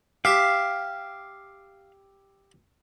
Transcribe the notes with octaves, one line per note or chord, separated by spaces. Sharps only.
G4 E5 F5